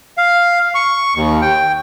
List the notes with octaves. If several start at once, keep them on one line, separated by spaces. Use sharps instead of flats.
F5
C#6
D#2
G5